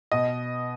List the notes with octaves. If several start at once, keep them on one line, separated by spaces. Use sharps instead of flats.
B2 D#5